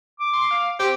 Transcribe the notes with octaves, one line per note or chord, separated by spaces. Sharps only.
D6
C6
F5
C4 G4